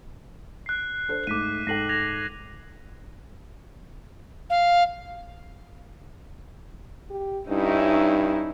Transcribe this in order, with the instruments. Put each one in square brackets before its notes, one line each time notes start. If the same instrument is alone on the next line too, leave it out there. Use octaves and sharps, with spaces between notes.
[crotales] F#6 C7
[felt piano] D4 A4 C5
[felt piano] G#2 A3 [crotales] D6 B6 D#7
[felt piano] G#2 A4 G5 [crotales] A#6 C7 F#7
[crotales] G#6 A#6 F7
[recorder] F5
[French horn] G4
[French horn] G2 [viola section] C#4 D#4 E4